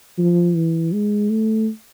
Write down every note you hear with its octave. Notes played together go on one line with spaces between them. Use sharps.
F3
E3
G#3
A3